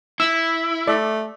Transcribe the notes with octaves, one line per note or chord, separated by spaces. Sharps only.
E4 E6
A3 D5